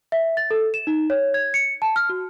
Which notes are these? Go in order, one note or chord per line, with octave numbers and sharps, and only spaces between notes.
E5
A6
A4
E7
D#4
C#5
G#6
C#7
A5
F6
F#4